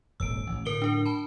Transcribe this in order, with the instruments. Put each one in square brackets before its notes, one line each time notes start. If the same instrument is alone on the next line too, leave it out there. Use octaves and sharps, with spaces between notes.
[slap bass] D#1 G#1 [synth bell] E6 D7
[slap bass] A1
[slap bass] A2 D3 [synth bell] A#4 D7 G7
[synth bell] D4 A#4
A5 B5